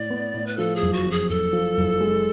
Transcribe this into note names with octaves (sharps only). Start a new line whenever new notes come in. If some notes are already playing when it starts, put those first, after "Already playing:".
Already playing: A2 D5
B3
A2
B4
F3 A4
G#4
F#1
F#4
F2
G#4
F#1 A4
F3
F#1
G#3